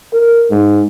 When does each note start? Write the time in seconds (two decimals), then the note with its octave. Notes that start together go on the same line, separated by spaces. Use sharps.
0.13 A#4
0.51 G#2